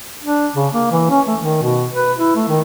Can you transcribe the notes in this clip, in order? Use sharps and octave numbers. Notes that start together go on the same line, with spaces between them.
D4
C#3
A#3
E3
C#4
A3
D#3
B2
B4
E4
A3
D#3